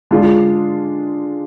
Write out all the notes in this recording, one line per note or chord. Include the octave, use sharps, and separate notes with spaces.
D3 G#3 D4 F4